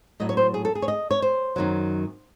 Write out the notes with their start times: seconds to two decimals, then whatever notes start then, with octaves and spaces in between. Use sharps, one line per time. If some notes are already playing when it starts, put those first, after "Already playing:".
0.20 A2 F#3 D#5
0.29 C#5
0.37 C5
0.54 G#4
0.65 A4
0.75 G#4
0.82 C#5
0.88 D#5
1.11 C#5
1.22 C5
1.56 F#2 D#3 F#3